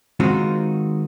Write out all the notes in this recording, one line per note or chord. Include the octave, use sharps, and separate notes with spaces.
D#3 G#3 C4 D#4 F4 F#4